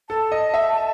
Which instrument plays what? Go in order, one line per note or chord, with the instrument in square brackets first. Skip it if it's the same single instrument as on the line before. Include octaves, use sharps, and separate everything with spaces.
[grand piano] A4 [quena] A5
[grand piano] D#5
E5